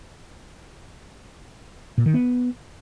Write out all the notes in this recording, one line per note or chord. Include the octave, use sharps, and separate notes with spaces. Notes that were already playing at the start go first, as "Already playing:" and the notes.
A#2
D#3
B3